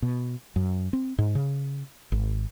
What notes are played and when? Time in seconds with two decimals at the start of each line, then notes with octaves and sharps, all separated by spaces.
0.02 B2
0.56 F#2
0.93 C4
1.18 G#2
1.35 C#3
2.12 G#1